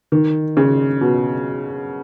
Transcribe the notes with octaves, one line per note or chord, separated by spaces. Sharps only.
D#3
C#3
B2